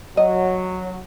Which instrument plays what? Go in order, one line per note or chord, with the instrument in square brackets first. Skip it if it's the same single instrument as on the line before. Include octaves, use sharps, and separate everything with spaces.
[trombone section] F#3 [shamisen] D#5